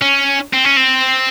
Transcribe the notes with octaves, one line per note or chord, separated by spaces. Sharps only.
C#4
C4
C#4
C4